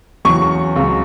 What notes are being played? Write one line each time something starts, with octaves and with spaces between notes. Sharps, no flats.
E2 C#3 F#3 C#6
C#2 C#3 F#3